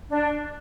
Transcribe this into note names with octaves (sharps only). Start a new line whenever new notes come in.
D4